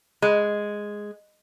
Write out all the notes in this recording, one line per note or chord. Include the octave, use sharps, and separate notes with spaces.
G#3